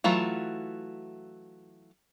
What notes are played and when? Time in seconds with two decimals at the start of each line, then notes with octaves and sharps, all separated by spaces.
0.04 E3 F#3 A3 F4